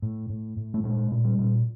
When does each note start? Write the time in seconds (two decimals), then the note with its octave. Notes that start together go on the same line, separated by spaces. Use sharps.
0.02 A2
0.30 A2
0.57 A2
0.74 A3
0.84 A#2 G#3
1.11 A#2
1.24 G3
1.39 A#2